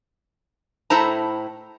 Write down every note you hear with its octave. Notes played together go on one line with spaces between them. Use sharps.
A2 E4 A4 C5 A5 A#5